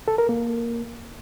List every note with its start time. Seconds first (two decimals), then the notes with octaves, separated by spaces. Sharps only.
0.08 A4
0.18 A#4
0.29 A#3